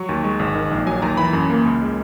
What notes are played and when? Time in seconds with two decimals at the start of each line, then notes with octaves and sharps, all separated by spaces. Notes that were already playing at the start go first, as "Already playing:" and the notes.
Already playing: F#3 C#6
0.09 D#2
0.24 G#3
0.39 G#1
0.55 D#3
0.71 A#1
0.86 F#3 G#5
1.02 D#2 A#5
1.17 E3 B5
1.33 F#2
1.50 A#3
1.66 C#2
1.81 G#3